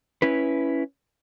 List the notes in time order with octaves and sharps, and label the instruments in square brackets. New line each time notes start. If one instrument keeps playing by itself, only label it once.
[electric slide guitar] C#4 E4 B4